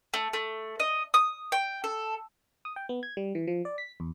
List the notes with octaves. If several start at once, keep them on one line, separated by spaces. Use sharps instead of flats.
A3
A3
D#5
D#6
G5
A4
D#6
G5
B3
G#6
G3
E3
F3
D5
B6
E2